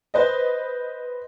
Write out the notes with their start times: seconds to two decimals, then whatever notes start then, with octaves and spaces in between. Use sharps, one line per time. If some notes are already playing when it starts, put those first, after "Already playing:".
0.14 B4 C5 D#5